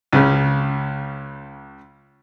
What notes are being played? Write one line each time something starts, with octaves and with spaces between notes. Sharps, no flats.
C#2 C#3